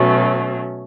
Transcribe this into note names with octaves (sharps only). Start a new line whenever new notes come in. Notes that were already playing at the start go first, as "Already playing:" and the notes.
Already playing: B2 F#3 A3 C#4